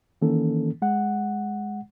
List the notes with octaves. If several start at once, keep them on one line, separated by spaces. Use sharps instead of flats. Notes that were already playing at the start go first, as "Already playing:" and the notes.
D#3 E3 A#3 C#4 A4
G#3 F#5